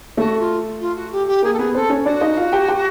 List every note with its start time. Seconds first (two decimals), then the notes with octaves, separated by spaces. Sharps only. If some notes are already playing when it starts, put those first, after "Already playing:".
0.17 A3 F#4 A4
0.39 F4
0.80 F4
0.95 F#4
1.11 G4
1.27 G4
1.43 A#3 G#4 A#4
1.53 A4
1.59 B3 G#4 B4
1.74 C4 A4 C5
1.90 C#4 C#5
2.06 D4 F#4 D5
2.21 D#4 D#5
2.37 F4 F5
2.52 G4 G5
2.68 G4 G5